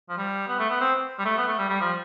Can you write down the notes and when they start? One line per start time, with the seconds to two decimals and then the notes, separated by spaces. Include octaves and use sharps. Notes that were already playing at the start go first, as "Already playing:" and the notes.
0.09 F3
0.17 G3
0.48 B3
0.59 A3
0.70 B3
0.80 C4
1.19 G3
1.25 A3
1.37 B3
1.48 A3
1.58 G3
1.69 G3
1.80 F3